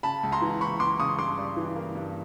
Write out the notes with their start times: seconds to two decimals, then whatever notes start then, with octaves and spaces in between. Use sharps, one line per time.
0.03 C#3 A5 B5
0.23 C#2
0.32 A#5 C6
0.42 E3
0.61 C#2 B5 C#6
0.80 C#2 C6 D6
0.99 C#3 C#6 D#6
1.19 G2 C6 D6
1.38 G3
1.57 E3
1.76 A#3
1.95 G2